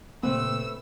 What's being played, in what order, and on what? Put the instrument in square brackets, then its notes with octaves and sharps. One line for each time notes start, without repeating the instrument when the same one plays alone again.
[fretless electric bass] A#2 C#3 A#3 [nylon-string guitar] A3 B4 [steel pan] C4 [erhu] E6